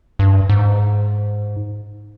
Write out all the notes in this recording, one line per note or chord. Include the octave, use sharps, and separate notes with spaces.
G2
G#2